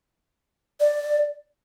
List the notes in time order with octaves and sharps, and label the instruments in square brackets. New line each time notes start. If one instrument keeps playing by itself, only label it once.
[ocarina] D5